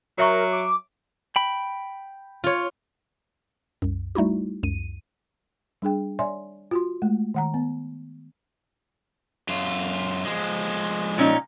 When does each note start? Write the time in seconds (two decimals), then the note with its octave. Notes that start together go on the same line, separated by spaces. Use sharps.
0.18 F#3 A#4 C#5 E5 C#6
0.52 D6
1.36 G5 B5
2.44 F4 C#5
3.82 C2 F#2
4.15 G3 A3 D#4 E4 F#4
4.63 C#2 F#2 D#7
5.82 G3 D4 G#4 G5
6.19 C#5 D5 E5 G#5 C6
6.71 F4 F#4 C6
7.02 G#3 A3
7.34 D#3 F#5 A#5
7.54 B3
9.49 F#2 F4
10.25 F3 G#3
11.18 A#2 C#4 D#4